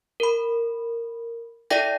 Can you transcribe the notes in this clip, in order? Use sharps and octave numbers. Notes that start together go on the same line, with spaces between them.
A#4 B5
E4 A4 D5 E5 G5 A#6